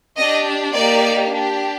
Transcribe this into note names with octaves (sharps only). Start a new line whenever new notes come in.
D4 G4 D#5
A#3 D#4 G4 D5
D4 G4